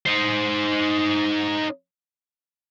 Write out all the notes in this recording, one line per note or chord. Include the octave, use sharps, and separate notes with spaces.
D#4 C5